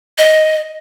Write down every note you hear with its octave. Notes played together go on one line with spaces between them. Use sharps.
D#5